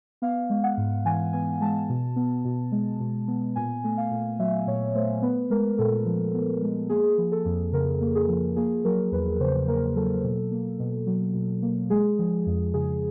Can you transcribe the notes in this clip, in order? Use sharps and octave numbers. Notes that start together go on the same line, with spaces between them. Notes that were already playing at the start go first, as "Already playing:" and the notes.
B3 F5
G#3
F#5
G#2
E3 G#5
B3 G#5
G#3 A5
B2
B3
B2
G#3
B2
B3
A#2 G#5
A3
F5
A#2
F#3 E5
A#2 C#5
A3 C5
B3 B4
G#3 A#4
A#2 A4
F3
B3
G#3
A#3 G#4
F3
A4
F2
C#3 A#4
A#3
G#4
F3
A#3 G#4
F#3 A#4
E2 B4
C#3 C5
A#3 A#4
F#3 A4
B2
A#3
B2
F#3
B2
A#3
G#3 G#4
F3
F2
C#3 G#4